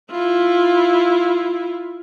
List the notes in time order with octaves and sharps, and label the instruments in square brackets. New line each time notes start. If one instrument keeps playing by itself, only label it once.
[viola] E4 F4